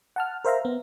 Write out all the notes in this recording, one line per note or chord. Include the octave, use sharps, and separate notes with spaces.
F#5 A5 F6
A#4 C5 E5 F5 A#5
B3